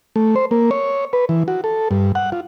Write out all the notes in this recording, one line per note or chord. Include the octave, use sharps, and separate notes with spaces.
A3
C5
A#3
C#5
B4
E3
F#4
A4
G2
F#5
F4